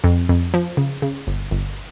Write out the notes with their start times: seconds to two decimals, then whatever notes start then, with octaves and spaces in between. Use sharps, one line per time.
0.04 F2
0.29 F2
0.54 F3
0.77 C#3
1.02 C#3
1.27 G1
1.51 G1